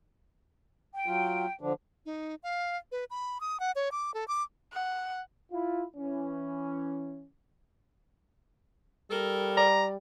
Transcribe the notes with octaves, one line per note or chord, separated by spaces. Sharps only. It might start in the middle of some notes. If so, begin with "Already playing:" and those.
G5
F#3 F4
D3 F3 D4
D#4
F5
B4
B5
D#6
F#5
C#5
D6
A4
D6
F#5
E4 F4
E3 C#4
G3 A4 A#4
D5 A#5